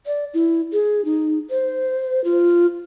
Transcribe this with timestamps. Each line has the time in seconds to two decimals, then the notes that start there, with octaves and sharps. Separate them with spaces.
0.06 D5
0.34 E4
0.73 G#4
1.05 D#4
1.50 C5
2.24 F4